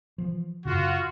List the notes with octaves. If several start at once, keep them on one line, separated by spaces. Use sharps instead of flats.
E3 F3
F#2 C#3 F4 F#4